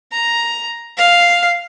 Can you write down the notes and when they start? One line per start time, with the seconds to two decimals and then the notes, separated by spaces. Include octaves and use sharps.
0.13 A#5
0.97 F5